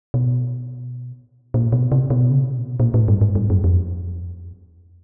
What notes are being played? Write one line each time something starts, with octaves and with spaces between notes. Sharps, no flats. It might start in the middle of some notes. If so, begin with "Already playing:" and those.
B2
A#2
B2
C3
B2
C#3
C3
A#2
B2
A#2
A2
G2
G#2
G2
F#2
F2